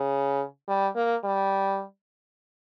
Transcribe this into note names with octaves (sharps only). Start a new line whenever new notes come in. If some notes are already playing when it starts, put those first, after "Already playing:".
Already playing: C#3
G3
A#3
G3